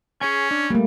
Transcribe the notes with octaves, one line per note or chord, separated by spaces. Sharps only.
C#4 G#4 C#5 G#5
D4
G3 A3 A#3